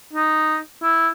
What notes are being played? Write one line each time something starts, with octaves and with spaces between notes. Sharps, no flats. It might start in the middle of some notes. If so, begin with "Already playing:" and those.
D#4
E4